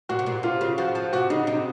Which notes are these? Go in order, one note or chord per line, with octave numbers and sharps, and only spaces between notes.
A#2 F#4
C3
A#2
C3 F4
C#3
F3 F#4
F3
C3 F#4
C#3 D#4
C3 D#4